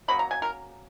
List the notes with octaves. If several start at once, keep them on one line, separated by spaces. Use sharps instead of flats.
C#3 F#3 A#3 B5
A#5
G#5
A#4